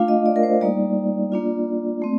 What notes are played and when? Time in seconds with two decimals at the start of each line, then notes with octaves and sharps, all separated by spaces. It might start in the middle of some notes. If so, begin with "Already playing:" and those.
Already playing: A3 D4 F4 F5
0.08 D#5
0.26 D5
0.36 A#4
0.43 C5
0.61 G3 A#3 D#4 D5
1.32 A#3 D4 F4
2.02 A3 C4